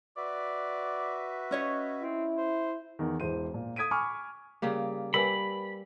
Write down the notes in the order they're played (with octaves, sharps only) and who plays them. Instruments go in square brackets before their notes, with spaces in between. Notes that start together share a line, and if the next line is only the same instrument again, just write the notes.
[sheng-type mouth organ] F#4 B4 E5 [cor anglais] D5
[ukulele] C#4 C#5 D#5
[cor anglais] C4 [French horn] E4
[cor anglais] C5
[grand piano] E2 D#3
E1 E3 C5 D#7
A#2
D#6 G#6 B6 D7 D#7
G#5 B5 C#6 D6 F6
[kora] C#3 G3 A#3
[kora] G3 [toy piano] A#4 B4 G#5 [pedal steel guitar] B5